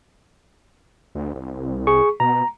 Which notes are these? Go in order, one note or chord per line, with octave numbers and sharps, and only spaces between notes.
D2
C2
G#4 C#6
B2 A#5